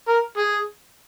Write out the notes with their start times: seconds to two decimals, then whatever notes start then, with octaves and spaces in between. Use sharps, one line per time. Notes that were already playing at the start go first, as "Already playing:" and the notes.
0.08 A#4
0.38 G#4